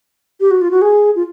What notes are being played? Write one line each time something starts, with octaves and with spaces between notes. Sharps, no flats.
G4
F#4
F4
F#4
G#4
F4